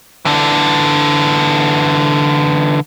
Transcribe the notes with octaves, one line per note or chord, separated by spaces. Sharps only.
D3 E3